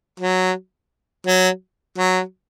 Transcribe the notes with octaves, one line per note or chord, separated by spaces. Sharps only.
F#3
F#3
F#3